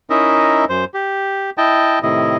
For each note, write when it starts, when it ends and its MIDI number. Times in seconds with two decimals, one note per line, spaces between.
0.10 0.65 61
0.10 0.65 63
0.10 0.65 64
0.10 0.65 70
0.10 0.65 75
0.10 0.65 76
0.69 0.85 42
0.69 0.85 72
0.94 1.50 67
1.58 1.99 64
1.58 1.99 75
1.58 1.99 79
1.58 1.99 81
2.03 2.37 45
2.03 2.37 48
2.03 2.37 51
2.03 2.37 64
2.03 2.37 75